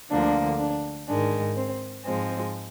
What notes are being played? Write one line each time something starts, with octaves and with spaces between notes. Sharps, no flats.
D2 D3 F3 A#3 D4
D4
G#2 D#3 G#3 D4
C4
G#2 F3 G#3 C4